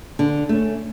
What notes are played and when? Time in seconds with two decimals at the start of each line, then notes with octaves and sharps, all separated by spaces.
0.19 D3
0.49 A3 C#4